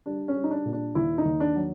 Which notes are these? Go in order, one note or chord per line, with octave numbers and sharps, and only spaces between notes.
G3 D4
C#4
G3
D#4
D4
A#2
D4
D#2 E4
D#4
D#2
D4
F#3